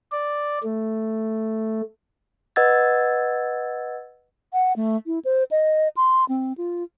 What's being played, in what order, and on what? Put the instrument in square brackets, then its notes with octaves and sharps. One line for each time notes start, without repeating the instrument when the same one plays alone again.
[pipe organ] D5
A3
[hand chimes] B4 D#5 F#5 E6 G#6 A6
[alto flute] F#5
A3
E4
C5
D#5
C6
C4
F4